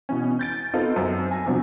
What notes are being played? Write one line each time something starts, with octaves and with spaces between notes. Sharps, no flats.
B2 E3 C#4
G6 A6 D7
B3 C4 D#4 F4 A4
F#2 F#3 C4
G#5 A#6
E2 C3 F3 F#3 D4